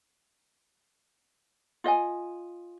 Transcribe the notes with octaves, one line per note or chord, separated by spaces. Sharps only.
F4 D#5 E5 G#5